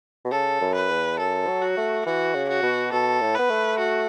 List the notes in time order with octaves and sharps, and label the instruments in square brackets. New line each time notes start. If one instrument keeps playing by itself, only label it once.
[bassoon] B2
[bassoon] C#3 [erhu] A4
[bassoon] F#2
[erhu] B4
[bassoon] E2
[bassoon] F#2 [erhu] A4
[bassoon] F#3
[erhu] F#4
[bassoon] A3
[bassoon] E3 [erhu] F#4
[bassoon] C#3
[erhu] F#4
[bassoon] B2
[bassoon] B2 [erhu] A4
[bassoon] A2
[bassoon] B3 [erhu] B4
[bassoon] A3
[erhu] F#4